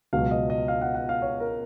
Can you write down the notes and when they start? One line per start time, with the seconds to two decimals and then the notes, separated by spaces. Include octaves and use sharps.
0.13 C#2 B2 F#3 F5
0.31 D#5
0.50 D#5
0.68 F5
0.81 F#5
0.95 F#5
1.09 F5
1.22 C#5
1.40 A#4